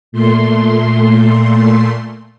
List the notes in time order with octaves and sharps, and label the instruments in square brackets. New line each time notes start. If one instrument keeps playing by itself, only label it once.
[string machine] A#2 A3 C6